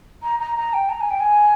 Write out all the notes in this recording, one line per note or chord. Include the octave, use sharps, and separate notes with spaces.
A#5
A#5
A#5
G5
A#5
G#5
G5
G#5